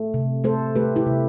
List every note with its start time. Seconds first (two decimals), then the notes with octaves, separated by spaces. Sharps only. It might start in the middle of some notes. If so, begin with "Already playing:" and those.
Already playing: A3
0.14 C3
0.44 A3 A4 C5
0.76 A3 G4 B4
0.96 E4 G4
1.07 C3